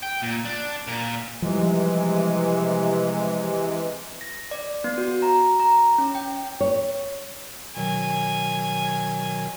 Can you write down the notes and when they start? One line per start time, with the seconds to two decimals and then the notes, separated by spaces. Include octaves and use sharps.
0.03 G5
0.22 A#2
0.45 D4
0.87 A#2 A#4
1.42 C3 E3 F3 G3 G#3
4.21 A#6
4.51 D5
4.84 B3
4.98 F#4
5.22 A#5
5.60 A#5
5.98 C#4
6.15 G5
6.61 C#5
7.77 B2 D#3 F#3 G#5